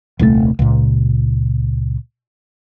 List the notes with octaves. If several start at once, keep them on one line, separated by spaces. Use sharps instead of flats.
D#1 C2 C#3 A3
C#2 A#2